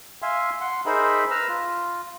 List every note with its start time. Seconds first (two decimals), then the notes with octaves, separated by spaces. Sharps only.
0.22 E5 F5 G#5 C6
0.61 F#5 C6
0.86 D#4 G#4 A#4 C5 E5 B5
1.31 B4 A#5 E6 F6
1.48 F4